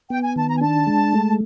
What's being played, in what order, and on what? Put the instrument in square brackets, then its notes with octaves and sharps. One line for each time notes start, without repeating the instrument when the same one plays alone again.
[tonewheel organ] B3 [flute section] G5
[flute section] G#5
[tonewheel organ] D#3 [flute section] A5
[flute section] A#5
G#5
[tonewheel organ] D4 [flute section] A5
[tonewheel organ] G#3
A3